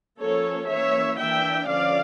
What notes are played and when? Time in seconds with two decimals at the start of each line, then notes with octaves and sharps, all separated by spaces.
0.20 F3 A#3 C#4 A4 C#5
0.69 E3 A#3 C#4 C#5 E5
1.18 E3 A#3 D4 E5 G5
1.67 D3 F3 C#4 D5 F5